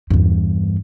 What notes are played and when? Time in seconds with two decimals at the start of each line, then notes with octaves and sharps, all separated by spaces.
0.10 E2 G2